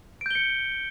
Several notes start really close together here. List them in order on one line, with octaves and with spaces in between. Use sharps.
D7 G6 G7 C#7